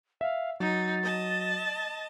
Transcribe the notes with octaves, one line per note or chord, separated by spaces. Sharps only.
E5 F5
F#3 D#4 A6
D#5 A5